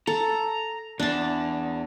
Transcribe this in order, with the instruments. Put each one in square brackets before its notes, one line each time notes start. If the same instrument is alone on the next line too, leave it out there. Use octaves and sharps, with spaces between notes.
[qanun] A4 [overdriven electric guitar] A#5
[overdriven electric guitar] E2 [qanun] D4 A5